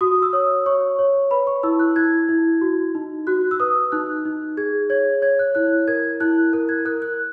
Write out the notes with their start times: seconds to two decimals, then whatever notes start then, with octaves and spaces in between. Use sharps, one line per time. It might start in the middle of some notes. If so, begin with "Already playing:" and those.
0.01 F#4 D#6
0.22 E6
0.33 C#5 D#6
0.66 C#5 C#6
0.99 C#5
1.31 B4 B5
1.47 C#6
1.63 E4 E6
1.80 F#6
1.96 E4 G#6
2.29 E4
2.61 F#4
2.95 D#4
3.27 F#4 F#6
3.51 E6
3.60 B4 D#6
3.92 D#4 F#6
4.25 D#4
4.57 G#4 G#6
4.90 C#5 G#6
5.22 C#5 G#6
5.39 F#6
5.55 E4 F#6
5.88 A#4 G#6
6.20 E4 F#6
6.53 A#4 F#6
6.69 G#6
6.85 A#4 F#6
7.02 F#6